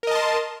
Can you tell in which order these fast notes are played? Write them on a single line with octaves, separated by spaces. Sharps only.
A#4 D#5 A5 C6